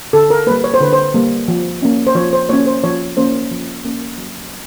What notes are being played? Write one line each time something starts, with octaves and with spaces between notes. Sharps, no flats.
D3 A4
A#4
G3 A#3 B4
C#5
C5
D3 B4
C5
G3 A#3
F3
A#3 C#4
C5
F3 C#5
C5
A#3 C#4 C#5
C5
F3 C#5
A#3 C#4 C5
F3
A#3 C#4
F#3